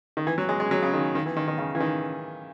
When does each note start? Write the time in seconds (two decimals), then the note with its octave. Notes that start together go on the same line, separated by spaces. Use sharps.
0.17 D#3
0.27 E3
0.38 F#3
0.49 G#3
0.60 G#3
0.71 F#3
0.83 C#3
0.93 D#3
1.15 D#3
1.26 E3
1.37 D#3
1.48 D#3
1.58 C#3
1.75 E3
1.80 D#3